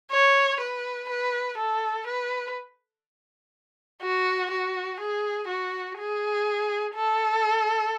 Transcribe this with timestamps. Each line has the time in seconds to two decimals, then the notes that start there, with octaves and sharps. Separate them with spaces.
0.11 C#5
0.60 B4
1.09 B4
1.58 A4
2.07 B4
4.02 F#4
4.51 F#4
5.00 G#4
5.48 F#4
5.98 G#4
6.95 A4